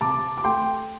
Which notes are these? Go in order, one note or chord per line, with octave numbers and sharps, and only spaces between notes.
C3 A5 D6
D6
A3 G5 C6